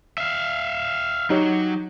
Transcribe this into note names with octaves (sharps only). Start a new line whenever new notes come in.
E5 F5
F#3 D#4 G4 C#5